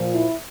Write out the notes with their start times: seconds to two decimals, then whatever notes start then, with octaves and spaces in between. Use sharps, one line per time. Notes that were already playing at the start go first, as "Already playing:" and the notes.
Already playing: A#2 F3
0.14 E4